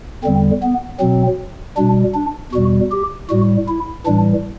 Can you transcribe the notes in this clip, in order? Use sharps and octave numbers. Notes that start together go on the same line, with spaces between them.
E2 D3 G3 C4
B3
B2 F#3 C4
B2 G3 D4
D4
E2 B2 G3 F#4
G4
A2 G3 F#4
E4
A2 E3 G3 D4